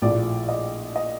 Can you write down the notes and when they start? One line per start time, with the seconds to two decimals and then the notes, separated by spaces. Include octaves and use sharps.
0.02 A#1 A2 F3 D5
0.49 D#5
0.96 D#5